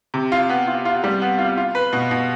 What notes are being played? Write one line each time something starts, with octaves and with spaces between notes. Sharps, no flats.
C3
F4
B3
F4
F4
G3
B3
F4
F4
B4
B2
B2